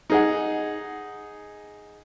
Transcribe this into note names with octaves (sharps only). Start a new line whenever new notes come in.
D#4 G#4 F#5